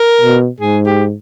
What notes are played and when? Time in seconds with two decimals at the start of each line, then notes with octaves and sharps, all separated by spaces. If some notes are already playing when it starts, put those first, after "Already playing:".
Already playing: A#4
0.21 B2
0.60 G#2 G#4
0.86 G4